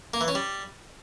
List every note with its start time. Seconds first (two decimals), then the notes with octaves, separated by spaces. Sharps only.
0.14 A#3
0.21 E3
0.28 C#4
0.35 G3